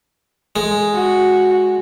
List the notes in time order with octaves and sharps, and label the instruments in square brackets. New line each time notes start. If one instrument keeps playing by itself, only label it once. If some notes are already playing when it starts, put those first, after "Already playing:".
[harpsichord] G#3
[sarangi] F#4